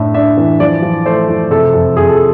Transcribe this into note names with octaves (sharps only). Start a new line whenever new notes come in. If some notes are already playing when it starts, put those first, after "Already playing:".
Already playing: A2 D4 E5
D4 E5
E3
F3 D5
F3
A3 C5
F3
C3 A4
F2
F2 G#4
A4